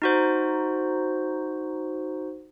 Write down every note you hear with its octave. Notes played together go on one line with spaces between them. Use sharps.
D#4 F#4 C5